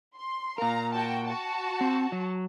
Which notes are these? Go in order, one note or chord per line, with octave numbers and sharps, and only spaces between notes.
C6
A#2 A#4 F5 A#5
F#4 G5 A5
F#4 A5
C4
F#3